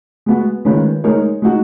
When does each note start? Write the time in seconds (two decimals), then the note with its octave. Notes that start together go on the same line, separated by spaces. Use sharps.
0.26 G#3 B3 F#4
0.65 D#3 G#3 C#4 F4 B4
1.04 G#3 D#4 A#4 C#5
1.42 G#3 D#4 F#4